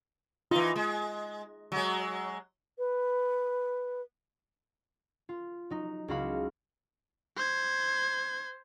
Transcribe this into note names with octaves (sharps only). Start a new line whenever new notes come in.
E3 D#4 F4
G#3
F#3 G#3
B4
F4
F#3 D#4
C#2 E4 F#4 F5 B5
C5 G#6